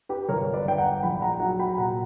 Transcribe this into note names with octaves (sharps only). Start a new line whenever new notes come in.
G4 B4
G1 A#4 C#5
B4 D5
G1 G5
F#5 A#5
A#1 G5 B5
F#5 A#5
F#3 F#5 A#5
G5 B5
A#2 F#5 A#5